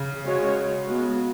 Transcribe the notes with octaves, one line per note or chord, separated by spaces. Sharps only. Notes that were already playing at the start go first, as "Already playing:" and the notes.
Already playing: C#3
G#3 C#4 F#4 C#5
G#3 B3 F#4